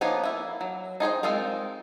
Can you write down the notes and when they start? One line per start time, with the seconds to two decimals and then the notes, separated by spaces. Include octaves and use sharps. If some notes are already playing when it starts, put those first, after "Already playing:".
0.01 F3 A#3 B3 C#4 D#4
0.24 A#3 E4
0.61 F#3
1.00 D#4 G#4 C5 G5
1.23 G#3 C4 D#4 F4 A#4